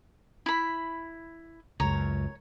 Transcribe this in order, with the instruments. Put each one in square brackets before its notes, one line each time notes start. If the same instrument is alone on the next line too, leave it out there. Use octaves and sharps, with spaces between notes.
[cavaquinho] E4 B5
[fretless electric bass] C#2 F#2 [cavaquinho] C#5 A#5